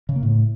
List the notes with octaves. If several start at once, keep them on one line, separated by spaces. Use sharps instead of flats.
C#3
A#3
A2